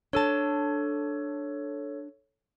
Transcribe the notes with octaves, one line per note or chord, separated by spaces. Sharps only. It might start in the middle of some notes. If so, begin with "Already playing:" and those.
D4 A4 C#5 A5